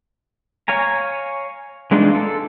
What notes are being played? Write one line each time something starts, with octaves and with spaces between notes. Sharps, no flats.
C#5 F5 G#5 A#5
E3 G#3 D4 D#4 F4
A4